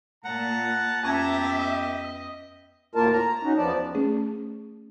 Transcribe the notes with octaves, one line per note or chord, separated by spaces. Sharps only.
A#2 F#5 A5 A#5
F2 B3 C#4 G4 E5 A5 A#5 G#6
D#5
D2 A2 A#3 F4 A#4 A5
A#5
C#4 D#4 F#4
E2 F3 B3 D5 A5
A3 C#4 G#4